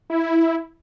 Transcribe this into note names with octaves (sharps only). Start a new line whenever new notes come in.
E4